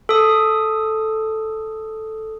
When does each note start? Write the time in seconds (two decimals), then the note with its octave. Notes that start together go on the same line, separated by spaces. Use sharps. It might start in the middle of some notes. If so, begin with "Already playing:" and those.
0.09 A4 D#6